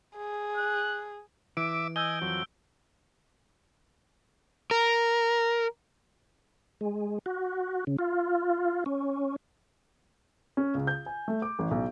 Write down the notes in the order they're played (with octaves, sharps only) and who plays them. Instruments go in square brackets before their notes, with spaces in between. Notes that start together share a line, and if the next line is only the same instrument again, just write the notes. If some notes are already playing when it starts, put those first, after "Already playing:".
[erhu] G#4
[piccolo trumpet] F#6
[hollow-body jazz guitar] E3 [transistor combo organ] E5 D6 [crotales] D7
[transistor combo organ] D#5 G#5 [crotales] E6 G6 G7
[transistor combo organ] F2 F#3
[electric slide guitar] A#4
[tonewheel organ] G#3
F#4
C#3
F4
C#4
[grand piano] C#4
C#2
G6
G#5
A3
D6
A1
B1